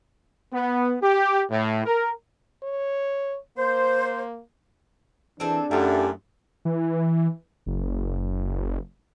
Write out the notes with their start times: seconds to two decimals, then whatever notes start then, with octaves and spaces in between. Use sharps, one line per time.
0.53 B3
1.03 G4
1.51 A2
1.86 A#4
2.63 C#5
3.58 A#3 C5
5.40 E3 C4 D4 G#4 A4
5.71 F#2 A3 E4 F4 G4
6.65 E3
7.66 F#1